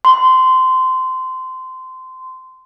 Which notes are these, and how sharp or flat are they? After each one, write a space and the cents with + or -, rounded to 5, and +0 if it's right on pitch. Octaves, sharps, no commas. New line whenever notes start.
C6 -20